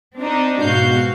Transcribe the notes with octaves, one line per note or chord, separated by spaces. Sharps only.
C4 D4 D#4
G#2 B2 F#4 F5 G6